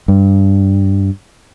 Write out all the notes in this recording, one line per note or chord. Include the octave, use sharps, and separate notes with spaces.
G2